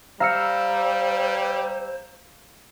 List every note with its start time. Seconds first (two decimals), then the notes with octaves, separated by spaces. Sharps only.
0.20 G3 C5 F5 A#5 E6 C#7